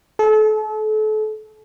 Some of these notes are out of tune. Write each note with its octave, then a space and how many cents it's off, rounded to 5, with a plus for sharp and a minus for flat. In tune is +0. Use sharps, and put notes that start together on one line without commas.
A4 -35